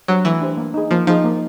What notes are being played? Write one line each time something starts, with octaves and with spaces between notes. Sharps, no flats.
F#3 D4 G4 C5
E3 A3
D4 G4 C5
A#3
D#4 G#4
F3 A#3
F3 D#4 G#4
A#3